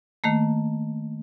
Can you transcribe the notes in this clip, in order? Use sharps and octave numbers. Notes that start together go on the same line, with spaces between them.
D#3 A3 A#3